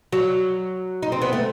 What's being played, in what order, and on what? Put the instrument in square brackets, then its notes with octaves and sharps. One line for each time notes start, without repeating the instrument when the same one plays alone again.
[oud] F#3 [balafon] F#4
[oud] D#4
C4
B3
A3